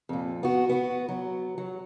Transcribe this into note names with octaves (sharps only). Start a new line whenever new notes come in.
F2 A#2
B3 F#4
B3 F#4
F#3
F#3